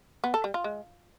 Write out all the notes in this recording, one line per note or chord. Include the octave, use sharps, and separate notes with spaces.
B3
A4
G3
F4
G#3